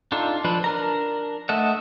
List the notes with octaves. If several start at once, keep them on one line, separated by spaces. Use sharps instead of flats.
D4 D#4 F4 A4
F3 D4 B4
D4 A#4 A#5
A3 A4 D#5 E5 F#5